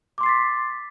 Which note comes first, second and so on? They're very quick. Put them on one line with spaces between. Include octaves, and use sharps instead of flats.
D6 C6 C7 A6 B6